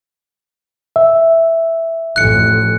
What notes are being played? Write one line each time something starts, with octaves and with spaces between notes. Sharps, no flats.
E5
A1 F2 F#6 C#7